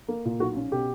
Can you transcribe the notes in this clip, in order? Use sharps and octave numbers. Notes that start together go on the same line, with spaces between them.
A#3
A#2
B1 F#4
C#4
B2 G4